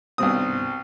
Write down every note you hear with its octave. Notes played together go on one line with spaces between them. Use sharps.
C2 G2 B2 D#3 C4 D#6